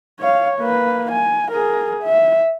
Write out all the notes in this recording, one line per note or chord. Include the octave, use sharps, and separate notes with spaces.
C#5 F5
A#3 B4
G#5
G#4 A#4
E5